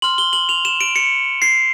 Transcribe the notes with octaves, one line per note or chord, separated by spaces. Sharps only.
C6 F6 F#7
G7
F#7
F7
E7
D7
C#7
C7